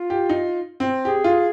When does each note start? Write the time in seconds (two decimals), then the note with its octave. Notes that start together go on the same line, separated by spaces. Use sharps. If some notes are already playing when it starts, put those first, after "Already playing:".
Already playing: F4
0.10 G4
0.29 D#4
0.80 C4
1.05 G4 G#4
1.24 F4